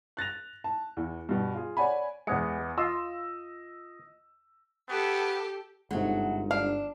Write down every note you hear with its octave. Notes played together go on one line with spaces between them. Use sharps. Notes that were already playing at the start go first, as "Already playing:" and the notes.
F#6 A6 A#6 F7
A5
E2 E3
G2 B2
F4 G#4
C#5 D5 F#5 G#5 B5
E2 G#3 B3 C#7
F4 D#5 E6
B3 G4 A4
G1 G#2 C3 F#3 G#3 A3
D4 F5